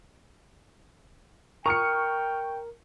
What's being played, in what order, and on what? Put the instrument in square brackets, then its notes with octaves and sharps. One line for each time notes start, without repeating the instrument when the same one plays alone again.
[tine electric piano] A#4 [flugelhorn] G5 [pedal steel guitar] A#5 D#6 F6 [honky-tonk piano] C#6 C#7